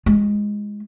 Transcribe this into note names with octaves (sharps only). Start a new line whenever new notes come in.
G#3 F4